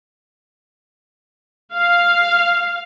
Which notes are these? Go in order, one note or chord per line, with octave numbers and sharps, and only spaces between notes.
F5